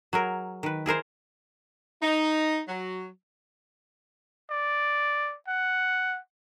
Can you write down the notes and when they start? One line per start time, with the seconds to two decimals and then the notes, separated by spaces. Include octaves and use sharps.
0.13 F#3 G#4 A#4
0.63 D#3 B4
0.86 E4 G#4 A#4 C5
2.02 D#4
2.68 F#3
4.50 D5
5.48 F#5